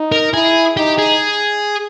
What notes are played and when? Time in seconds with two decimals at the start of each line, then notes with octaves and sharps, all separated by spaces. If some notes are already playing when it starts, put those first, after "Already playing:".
Already playing: D#4
0.12 A#4
0.33 E4 G#4
0.77 D#4 G4
0.99 G#4